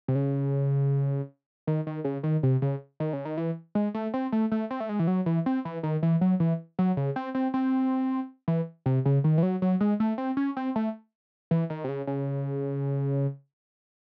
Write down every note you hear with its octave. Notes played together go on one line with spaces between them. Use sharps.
C3
C#3
D#3
D#3
C#3
D#3
C3
C#3
D#3
C#3
D#3
E3
G#3
A3
C4
A3
A3
C4
A3
G#3
E3
F#3
E3
C4
E3
D#3
E3
F#3
E3
F#3
C#3
C4
C4
C4
E3
C3
C#3
D#3
E3
F#3
F#3
G#3
A3
C4
C#4
C4
A3
E3
D#3
C3
C#3
C#3